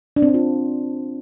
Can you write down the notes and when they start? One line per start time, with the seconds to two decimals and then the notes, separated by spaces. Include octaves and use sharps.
0.16 D4
0.22 C4
0.28 D4
0.34 F4